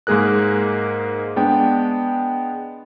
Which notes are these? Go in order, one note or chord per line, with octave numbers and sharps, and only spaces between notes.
G#2 G#3 A#3 G#4 A#4 F#6
G#3 B3 D4 G5